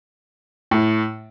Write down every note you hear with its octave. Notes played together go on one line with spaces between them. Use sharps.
A2